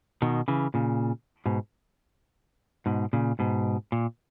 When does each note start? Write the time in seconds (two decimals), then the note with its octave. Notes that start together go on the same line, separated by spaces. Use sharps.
0.22 B2 D#3
0.48 C#3 E3
0.74 A#2 C#3
1.46 G#2 B2
2.86 G#2 B2
3.13 A#2 C#3
3.39 G#2 B2
3.92 A#2